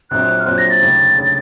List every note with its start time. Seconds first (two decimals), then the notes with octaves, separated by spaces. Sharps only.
0.11 A#1 A#2 F#3 C4 F#6
0.40 F6
0.46 A#1 A#2 F#3 C4 F#6
0.58 A#6
0.70 A6
0.81 F1 D#2 C#3
1.18 C#3